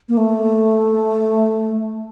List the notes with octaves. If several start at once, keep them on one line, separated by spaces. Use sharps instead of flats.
A#3
A3